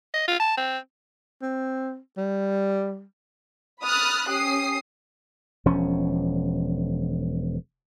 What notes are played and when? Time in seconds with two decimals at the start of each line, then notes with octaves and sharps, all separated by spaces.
0.14 D#5
0.28 F4
0.40 A5
0.58 C4
1.42 C4
2.17 G3
3.82 B5 D#6 F6 F#6 A6
4.28 C#4 G4 D#6 C7
5.65 E1 F3 C#4